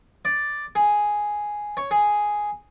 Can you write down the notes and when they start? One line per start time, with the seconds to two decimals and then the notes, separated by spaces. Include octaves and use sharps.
0.25 D5
0.75 G#4
1.77 C#5
1.91 G#4